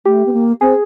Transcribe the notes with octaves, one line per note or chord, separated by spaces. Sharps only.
A3 G4
B3
A#3
C4 G#4